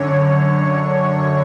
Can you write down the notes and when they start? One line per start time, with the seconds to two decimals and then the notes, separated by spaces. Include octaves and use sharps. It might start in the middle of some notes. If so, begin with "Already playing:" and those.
Already playing: F#2 D3 C#5